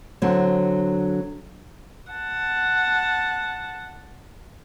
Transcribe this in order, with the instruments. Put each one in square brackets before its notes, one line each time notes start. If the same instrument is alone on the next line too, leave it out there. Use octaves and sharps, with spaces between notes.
[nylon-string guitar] D3 F#3 C4
[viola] F#5 A5